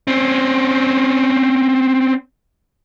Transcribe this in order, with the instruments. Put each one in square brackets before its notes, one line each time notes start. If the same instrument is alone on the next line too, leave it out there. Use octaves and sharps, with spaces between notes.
[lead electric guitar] C4 C#4